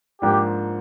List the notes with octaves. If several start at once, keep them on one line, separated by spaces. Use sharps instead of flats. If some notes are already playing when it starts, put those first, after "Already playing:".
G#2 F3 A#3 D4 F4 G4